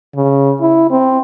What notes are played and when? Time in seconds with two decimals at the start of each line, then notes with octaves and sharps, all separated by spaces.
0.15 C#3
0.61 E4
0.90 C4